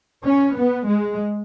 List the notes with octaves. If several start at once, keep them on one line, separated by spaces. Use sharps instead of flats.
C#4
B3
G#3